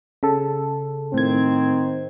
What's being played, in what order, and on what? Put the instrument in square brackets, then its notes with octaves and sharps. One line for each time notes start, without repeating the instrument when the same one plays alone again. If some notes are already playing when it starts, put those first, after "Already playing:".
[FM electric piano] C#3 A4
[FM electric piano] A2 G#6 [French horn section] D#3 C4